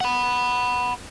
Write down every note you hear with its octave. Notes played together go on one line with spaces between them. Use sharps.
F#5 B5